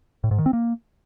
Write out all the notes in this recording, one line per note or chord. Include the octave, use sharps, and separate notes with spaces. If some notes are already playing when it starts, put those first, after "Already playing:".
A2
G#2
D#3
C4
A#3